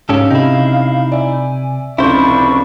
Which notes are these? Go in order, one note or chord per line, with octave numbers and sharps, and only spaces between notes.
G#2 C#3 C#4 G4 A4 F5
C3 D#4 E4
D5 E5 G#5
F1 C#2 D4 E4 C5 B5 C#6